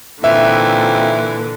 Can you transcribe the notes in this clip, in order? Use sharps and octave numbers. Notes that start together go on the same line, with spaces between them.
A#2 D3 E3 C4 D#4 F4 E5